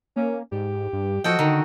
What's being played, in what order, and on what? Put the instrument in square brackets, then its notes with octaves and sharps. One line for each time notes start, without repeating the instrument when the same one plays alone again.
[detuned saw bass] A#3 [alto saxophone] C#4
[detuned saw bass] G#2 [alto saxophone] G4
[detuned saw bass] G2
[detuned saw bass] F3 [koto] F#4 A4 G5 [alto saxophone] D#5
[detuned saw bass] D3 [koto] D#3